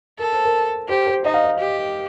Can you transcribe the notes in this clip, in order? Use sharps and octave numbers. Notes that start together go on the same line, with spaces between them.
A4 A#4
C5
A#4
G4 C5
C5
D#4 D#5
F5
D#5
G4